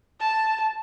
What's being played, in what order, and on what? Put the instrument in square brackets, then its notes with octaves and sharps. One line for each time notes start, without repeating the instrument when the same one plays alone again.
[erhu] A5